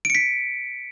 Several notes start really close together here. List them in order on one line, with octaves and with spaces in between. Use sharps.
D7 C#7 B6